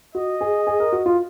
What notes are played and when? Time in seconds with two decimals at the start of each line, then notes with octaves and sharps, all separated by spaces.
0.15 F#4 D#5
0.41 G#4
0.67 G#4
0.80 A#4
0.92 F#4
1.06 F4